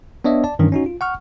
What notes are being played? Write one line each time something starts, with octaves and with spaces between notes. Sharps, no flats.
B3 D4 C#5 D#5 E5
D5 A5
G2 D#3 E3 C#4 D4
C#4 D#4 F#4
F4
F#5 C#6 F6